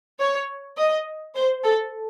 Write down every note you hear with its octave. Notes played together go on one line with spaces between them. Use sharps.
C#5
D#5
C5
A4